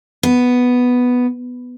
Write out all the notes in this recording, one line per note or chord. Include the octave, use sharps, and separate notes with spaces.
B3